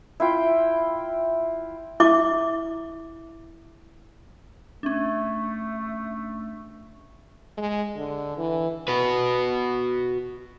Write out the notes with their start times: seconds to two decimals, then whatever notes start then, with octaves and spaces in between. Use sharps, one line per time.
0.20 E4 F4 G5
2.00 E4 E5 D6
4.83 A3 C#4 D4
7.57 G#3
7.96 D3
8.38 E3
8.88 F#4 B4